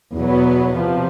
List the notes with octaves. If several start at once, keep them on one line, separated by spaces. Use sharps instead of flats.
E2 B2 F#3 B3
C3 F3